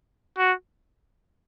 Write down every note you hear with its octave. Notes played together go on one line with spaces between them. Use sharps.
F#4